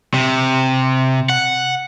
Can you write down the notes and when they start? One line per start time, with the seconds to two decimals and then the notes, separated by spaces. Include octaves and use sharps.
0.14 C3
1.30 F#5